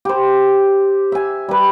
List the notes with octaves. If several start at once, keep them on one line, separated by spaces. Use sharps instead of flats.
G4 C5
E5 G#5
G3 B4